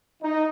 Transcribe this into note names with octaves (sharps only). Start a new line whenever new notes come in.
D#4